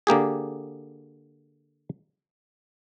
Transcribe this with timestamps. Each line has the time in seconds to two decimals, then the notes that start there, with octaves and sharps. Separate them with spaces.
0.07 D3 A#3 G4 G#4